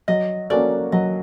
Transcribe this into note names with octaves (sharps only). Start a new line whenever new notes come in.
F#3 D#5
A#3 C#4 F#4 A4 D5
F#3 D#5